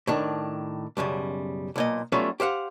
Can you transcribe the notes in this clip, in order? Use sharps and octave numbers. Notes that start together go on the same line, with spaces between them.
A2 D#3 D4
B1 F#2 C#3 G3
B1 A#2 D#5
F#3 G3 A3 B3 C#4 F4
G4 C5 F5 F#5